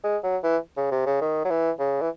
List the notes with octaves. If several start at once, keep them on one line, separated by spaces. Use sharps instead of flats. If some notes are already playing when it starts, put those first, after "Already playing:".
G#3
F#3
E3
C#3
C3
C#3
D#3
F#3
E3
C#3
E3